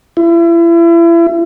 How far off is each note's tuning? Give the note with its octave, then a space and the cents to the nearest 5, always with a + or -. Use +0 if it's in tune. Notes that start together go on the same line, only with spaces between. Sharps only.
E4 +35